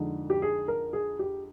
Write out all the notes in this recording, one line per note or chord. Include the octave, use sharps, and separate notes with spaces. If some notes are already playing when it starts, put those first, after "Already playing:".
Already playing: F2 D3 G#3 D#4
G4
G#4
A#4
G#4
G4